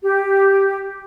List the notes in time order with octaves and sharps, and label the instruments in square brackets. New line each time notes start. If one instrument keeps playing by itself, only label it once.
[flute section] G4